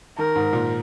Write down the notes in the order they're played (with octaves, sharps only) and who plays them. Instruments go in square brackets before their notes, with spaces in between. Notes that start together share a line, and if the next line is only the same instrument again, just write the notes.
[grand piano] D#3 [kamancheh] A#4
[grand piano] G#2
A#2